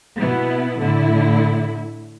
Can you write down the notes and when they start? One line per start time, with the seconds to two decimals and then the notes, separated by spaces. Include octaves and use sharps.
0.18 B2 B3 E4
0.80 A2 D3 E4